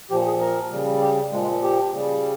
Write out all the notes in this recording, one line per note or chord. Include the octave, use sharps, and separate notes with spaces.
A#2 F3 G4
G#4
A#4
C#3 G3
G4
A#2 F3 G#3
G#3
A#3
G4
C#3 G3